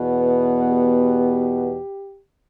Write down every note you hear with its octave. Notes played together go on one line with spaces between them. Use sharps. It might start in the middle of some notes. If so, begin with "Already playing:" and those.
Already playing: E2 B2 B3
G4